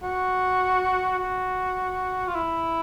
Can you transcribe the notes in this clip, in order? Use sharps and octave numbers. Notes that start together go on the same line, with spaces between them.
F#4
F#4
F4
E4